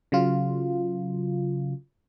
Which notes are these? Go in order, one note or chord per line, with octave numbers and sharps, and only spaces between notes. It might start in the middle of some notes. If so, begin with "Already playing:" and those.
C#3 F#3 F4